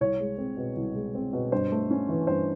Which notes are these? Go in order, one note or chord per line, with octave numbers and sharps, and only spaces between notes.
C2 C#5
G#3
C4
B2
C2
G#3
C4
B2
G2 C5
A3
C#4
E3
G2 C5